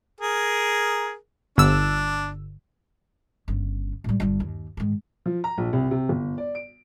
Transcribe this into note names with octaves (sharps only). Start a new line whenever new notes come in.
G#4 A#4
G1 D4 E6
G1 C#3
A2 G3
G1 G2
D#2
G#2 D#3
F3
A#5
A#1
C2
C3
G1
D5
D7